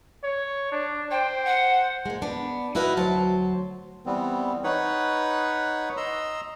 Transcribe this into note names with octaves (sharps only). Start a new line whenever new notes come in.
C#5
D4
C5 G5
F#5
G#3 A#3
B3 D4
D#4 E4 F#4 B4 D#5 F5
D2 F#3 C5 A5
E3 G3 B3 C4
D#4 B4 C#5 F#5
D#5 A#5 C6 E6